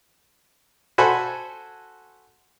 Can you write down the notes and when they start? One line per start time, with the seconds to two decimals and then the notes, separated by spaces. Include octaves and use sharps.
0.98 F#4 A4 C5 G#5 B5